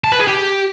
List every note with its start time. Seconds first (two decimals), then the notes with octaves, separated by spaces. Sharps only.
0.04 A5
0.12 B4
0.20 G#4
0.28 G4